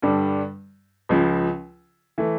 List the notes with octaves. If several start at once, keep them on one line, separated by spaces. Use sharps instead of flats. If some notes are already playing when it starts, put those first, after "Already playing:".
G2 D3 G3 D4
C#2 C#3 F3
E3 A3